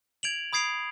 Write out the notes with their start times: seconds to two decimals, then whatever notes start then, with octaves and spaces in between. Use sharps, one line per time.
0.23 G#6 D7 F7 F#7
0.53 B5 D#6 G#6 C7 D7 F7